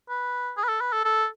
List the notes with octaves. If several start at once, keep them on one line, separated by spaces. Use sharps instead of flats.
B4
G#4
B4
A4
B4
A4
A4